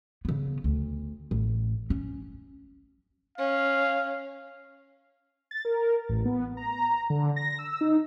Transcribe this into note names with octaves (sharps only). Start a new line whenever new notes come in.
C#3 B3
D2
A1
C#4
C#4 F5
A6
A#4
A1
B3
A#5
D3
A#6
E6
D#4